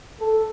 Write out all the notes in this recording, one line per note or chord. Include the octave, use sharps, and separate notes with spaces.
A4